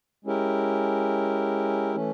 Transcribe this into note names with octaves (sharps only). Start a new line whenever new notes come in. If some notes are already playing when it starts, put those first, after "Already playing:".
G#3 C#4 E4 G4 A#4
E3 A3 C#4